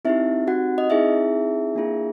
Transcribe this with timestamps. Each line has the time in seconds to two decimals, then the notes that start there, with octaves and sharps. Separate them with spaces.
0.05 C4 D#4 E4 G4 E5
0.47 F#4 F#5
0.78 D#5
0.90 C4 D#4 E4 G#4 E5
1.75 A#3 D4 F4 G#4